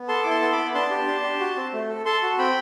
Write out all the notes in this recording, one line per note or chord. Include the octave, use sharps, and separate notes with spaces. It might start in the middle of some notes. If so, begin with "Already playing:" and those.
Already playing: B3
A4 A5 C6
E4 D6
A5 C6
B3 C6
B5 D6
B3
D4 A5 C6
G4
D4
G4
F#4
C4
A3
A4
A4 A5 C6
F#4
C4 G5 B5